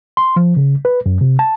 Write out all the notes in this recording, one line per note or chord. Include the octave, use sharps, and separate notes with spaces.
C6
F3
C#3
B4
F#2
C3
A5